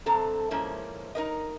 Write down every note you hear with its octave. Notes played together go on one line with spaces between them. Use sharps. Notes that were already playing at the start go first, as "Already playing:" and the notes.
G2 C3 C4 A4 A#5
G#2 F3 A#3 C#4 E4
D#4 A#4 D#5